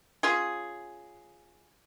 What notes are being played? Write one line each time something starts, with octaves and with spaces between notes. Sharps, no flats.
C#4 F4 G#4